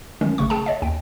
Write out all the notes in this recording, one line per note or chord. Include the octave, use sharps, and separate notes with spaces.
D#3 F#3 G#3 C#4
G#1 C#3 A3 C#6
G#4 G5 A5
C#5 D#5 E5
D#2 G5